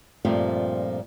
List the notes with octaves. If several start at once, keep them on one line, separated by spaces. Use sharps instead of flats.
G2 A#2 F3 A3 C4